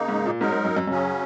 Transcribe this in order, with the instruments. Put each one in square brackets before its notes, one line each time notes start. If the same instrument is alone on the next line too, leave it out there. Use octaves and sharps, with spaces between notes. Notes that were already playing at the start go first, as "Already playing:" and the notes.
Already playing: [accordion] C#3 A#3 D#4
[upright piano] G#2
A#2
[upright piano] G#2 [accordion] F#3 D#4 A#4
[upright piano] G#2
F#2
F#2
[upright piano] F#2 [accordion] C#3 F#3 C#4